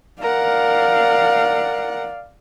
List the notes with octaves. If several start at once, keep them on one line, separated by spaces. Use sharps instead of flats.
A#4 D5 F5 F#5